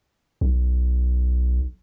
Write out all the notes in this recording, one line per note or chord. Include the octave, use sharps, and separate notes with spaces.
B1